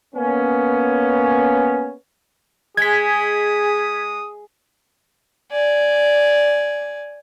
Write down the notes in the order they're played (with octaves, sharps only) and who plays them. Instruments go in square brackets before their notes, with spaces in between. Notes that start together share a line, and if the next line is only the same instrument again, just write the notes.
[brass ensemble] A#3 B3 C#4
[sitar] G#3 [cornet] G#4 [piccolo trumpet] D#6 [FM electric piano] G#6 B6
[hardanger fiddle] D5 G#5